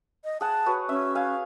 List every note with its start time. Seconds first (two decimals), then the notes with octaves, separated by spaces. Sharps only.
0.24 D#5
0.41 G#4 F#5 A5
0.66 F#4 B4 C#5
0.89 C#4 E5
1.15 F5 G#5